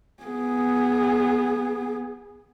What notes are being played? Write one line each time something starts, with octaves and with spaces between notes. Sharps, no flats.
B3 G#4